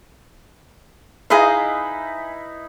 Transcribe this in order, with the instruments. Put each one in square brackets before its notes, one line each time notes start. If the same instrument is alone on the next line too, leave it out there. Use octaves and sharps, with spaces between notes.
[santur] D#4 E4 B4 [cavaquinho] G#4 D#5 F5